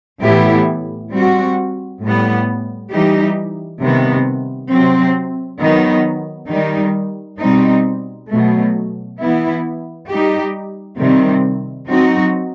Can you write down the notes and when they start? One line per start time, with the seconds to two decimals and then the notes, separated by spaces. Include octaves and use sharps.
0.22 A2 E3 B3 E4 G4
1.12 G3 C4 F#4
2.01 A2 G3 B3
2.91 E3 G3 D#4 G4
3.81 C3 D#3 G3 B3
4.71 C3 F#3 C4
5.61 D#3 F#3 B3 D#4
6.50 D#3 G3 D#4
7.40 B2 G3 C4 D#4
8.29 B2 F#3 A3
9.20 E3 B3 E4
10.09 G3 D#4 G4
10.98 C3 D#3 G3 C4
11.88 F#3 C4 D#4 F#4